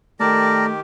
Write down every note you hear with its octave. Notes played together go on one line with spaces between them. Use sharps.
D#3 A3 G4 A#4 D5 A5 A#6